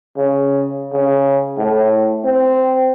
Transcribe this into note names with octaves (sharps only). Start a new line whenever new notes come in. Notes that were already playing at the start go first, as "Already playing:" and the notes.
C#3
C#3
A2
C4